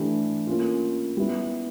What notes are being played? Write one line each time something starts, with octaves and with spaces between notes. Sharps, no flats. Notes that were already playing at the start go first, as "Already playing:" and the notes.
Already playing: E3 A3 D4 G4
A#3 C#4 F4
G3 B3 E4